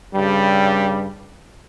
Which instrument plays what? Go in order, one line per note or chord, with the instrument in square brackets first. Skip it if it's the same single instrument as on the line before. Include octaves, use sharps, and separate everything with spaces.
[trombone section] G2 C#3 G3